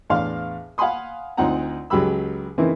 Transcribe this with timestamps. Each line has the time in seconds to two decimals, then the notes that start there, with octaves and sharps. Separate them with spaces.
0.10 E2 A2 D4 F5 C6 F6
0.78 F5 F#5 G#5 B5 C6 D#6
1.37 D2 C4 D#4 F4 F#5 A#5
1.90 C#2 F#3 G4 G#4 B5 E6
2.58 C#3 E3 A#3 C4 D#4 E4